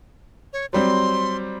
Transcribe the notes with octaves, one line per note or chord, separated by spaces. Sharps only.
C#5
F#3 G3 C4 C6